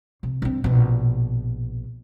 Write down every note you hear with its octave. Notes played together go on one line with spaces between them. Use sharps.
C3
G2 C4
A#1 B2